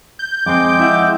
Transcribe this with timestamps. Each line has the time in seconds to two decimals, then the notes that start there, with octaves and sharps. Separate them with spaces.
0.19 G6
0.46 F2 G#3 C4 G5 D6
0.80 E4 E5 F#5